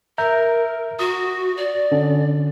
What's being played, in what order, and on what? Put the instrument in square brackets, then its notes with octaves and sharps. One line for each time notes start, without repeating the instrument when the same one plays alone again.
[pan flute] A#4 [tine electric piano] E5 A#5 G6
[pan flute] F#4 [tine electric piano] D#6
[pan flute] D5
[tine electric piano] D3 C#4